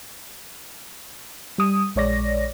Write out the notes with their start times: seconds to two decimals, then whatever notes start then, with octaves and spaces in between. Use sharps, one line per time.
1.58 G3 D#6
1.95 A#1 G#3 C#5 D5 A#6